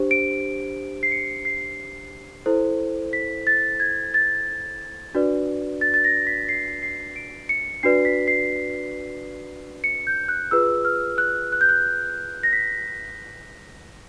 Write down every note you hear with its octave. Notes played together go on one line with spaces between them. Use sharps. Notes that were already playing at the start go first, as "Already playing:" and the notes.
Already playing: D4 G4 C5
D7
C7
C#7
C7
E4 A4 C5
B6
A6
G#6
A6
D4 F#4 B4 D5
A6
A6
A#6
B6
C7
C7
D7
C#7
D4 F#4 B4 D5 C7
B6
C7
C#7
G6
F#6
F4 G#4 B4 E6
F6
F#6
F#6
G6
F#6
A#6
B6